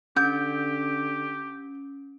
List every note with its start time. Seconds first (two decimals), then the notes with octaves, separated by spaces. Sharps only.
0.17 D3 C#4 G4 G6